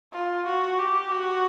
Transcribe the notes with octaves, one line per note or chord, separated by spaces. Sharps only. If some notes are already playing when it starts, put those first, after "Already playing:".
F4
F#4
G4
F#4